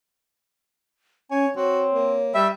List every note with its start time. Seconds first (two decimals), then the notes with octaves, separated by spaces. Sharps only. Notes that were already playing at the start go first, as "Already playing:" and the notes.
1.31 C#4 C#5 G#5
1.56 C4 F#4 C#5
1.93 A#3
2.35 G3 G4 E5